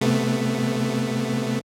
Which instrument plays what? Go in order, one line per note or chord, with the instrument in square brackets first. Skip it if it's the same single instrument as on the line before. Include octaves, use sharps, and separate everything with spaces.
[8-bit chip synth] C3 A3 B3